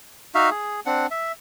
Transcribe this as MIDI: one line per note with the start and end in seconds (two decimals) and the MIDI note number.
0.35 0.50 63
0.35 0.50 66
0.35 0.50 76
0.35 0.50 77
0.51 0.80 68
0.86 1.07 60
0.86 1.07 62
0.86 1.07 78
1.11 1.32 76